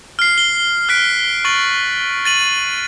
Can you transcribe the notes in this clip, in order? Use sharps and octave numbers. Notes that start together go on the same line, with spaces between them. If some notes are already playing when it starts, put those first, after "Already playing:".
F6 C7
G7
F6 F#6 B6 D7
C#6 A6 F#7
A6 D#7 F#7